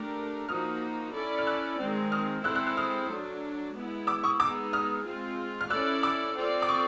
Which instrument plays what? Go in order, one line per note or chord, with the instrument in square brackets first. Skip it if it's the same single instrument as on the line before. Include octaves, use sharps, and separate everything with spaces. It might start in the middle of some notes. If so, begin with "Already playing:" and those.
Already playing: [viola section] A3 D4 G4 A#4
[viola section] F3 A#3 D#4 F#4 [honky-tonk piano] D#6 F6
[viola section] C#4 E4 A4 D5
[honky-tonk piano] F6
E6 F#6
[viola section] D#3 G#3 C4
[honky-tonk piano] D#6 F6
[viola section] G#3 C4 E4 A4 C5 [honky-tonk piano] E6 F#6
[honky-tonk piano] E6 F#6
E6 F#6
D#6 F6
[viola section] F#3 A3 D4
G#3 B3 E4
[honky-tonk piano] D6 E6
C#6 D#6
[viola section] G#3 B3 D#4 G#4 [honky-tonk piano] D6 E6
[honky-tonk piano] D#6 F6
[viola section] G#3 C4 F4
[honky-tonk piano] F6
[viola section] C#4 E4 A4 D5 [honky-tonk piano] E6 F#6
[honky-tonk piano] D6 E6
[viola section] C4 F4 A4 D5
[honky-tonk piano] D6
C#6 D#6